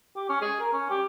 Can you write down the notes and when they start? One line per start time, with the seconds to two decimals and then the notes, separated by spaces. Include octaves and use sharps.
0.16 G4
0.29 C#4
0.42 G#4
0.60 A#4
0.73 C#4
0.90 G4